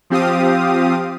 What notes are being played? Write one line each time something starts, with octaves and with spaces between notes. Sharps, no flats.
F3 C4 G4 F5 D#6